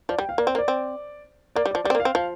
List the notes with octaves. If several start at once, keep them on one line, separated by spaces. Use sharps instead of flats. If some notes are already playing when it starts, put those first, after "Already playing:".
F3 D5
G3 G5
F5
A#3 D5
C4 C5
A#3
D5
C4
A#3 D5
G3
F3 D5
G3 D5
C4
A#3
F5
C4
F3 F5